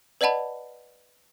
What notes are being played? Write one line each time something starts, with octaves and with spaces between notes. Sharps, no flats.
B4 D5 D#5 F#5 A5 B5